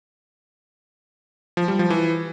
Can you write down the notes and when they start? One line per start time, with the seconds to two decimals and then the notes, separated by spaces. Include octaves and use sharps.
1.57 F3
1.68 G3
1.79 F3
1.90 E3